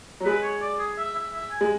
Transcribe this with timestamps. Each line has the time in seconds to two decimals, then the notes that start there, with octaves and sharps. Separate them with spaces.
0.20 F#3
0.25 G#3 B4
0.43 C#5
0.62 D5
0.79 G#4
0.98 E5
1.15 E5
1.33 E5
1.51 G#5
1.61 G#3